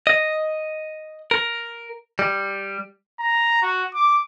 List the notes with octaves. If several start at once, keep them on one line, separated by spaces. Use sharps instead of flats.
D#5
A#4
G3
A#5
F#4
D6